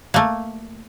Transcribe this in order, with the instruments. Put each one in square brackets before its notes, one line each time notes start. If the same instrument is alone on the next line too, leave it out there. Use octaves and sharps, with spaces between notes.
[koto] A3 A#3